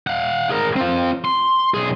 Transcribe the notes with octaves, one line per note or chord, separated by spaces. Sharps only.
F5 F#5
G#4 A#4
C4 F4
C6
B1 G#4